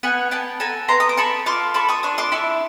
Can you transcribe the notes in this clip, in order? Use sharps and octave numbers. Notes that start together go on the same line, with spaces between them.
B3 F#5 G#5
B3 G5 A5
A4 G#5 A#5
B3 A#5 C6
D#6
D6
A4 B5 C#6
F4 C6 D6
A4 B5 C#6
C#6 D#6
D4 C#6 D#6
C6 D6
E4 C#6 D#6